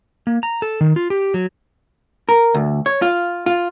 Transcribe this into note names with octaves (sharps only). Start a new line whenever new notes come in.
A#3
A#5
A4
D#3
F4
G4
F#3
A#4
D2
C#5
F4
F4